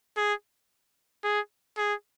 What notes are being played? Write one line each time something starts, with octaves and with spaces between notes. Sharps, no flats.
G#4
G#4
G#4